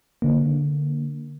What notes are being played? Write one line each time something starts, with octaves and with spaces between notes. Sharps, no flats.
D3 A#3